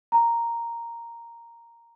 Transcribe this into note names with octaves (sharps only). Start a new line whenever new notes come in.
A#5